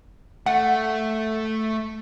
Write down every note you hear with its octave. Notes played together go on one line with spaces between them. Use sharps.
A3 F#5